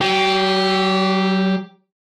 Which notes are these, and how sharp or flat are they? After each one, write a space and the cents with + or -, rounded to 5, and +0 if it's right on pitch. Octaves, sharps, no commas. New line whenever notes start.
F#3 +40 G4 +0